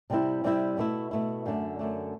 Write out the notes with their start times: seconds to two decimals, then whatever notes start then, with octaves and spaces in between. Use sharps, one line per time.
0.10 C3 G3 C4 E4
0.44 C3 G3 C4 E4
0.78 B2 A3 E4
1.11 B2 A3 E4
1.46 F#2 D3 A3 D4
1.79 F#2 D3 A3 D4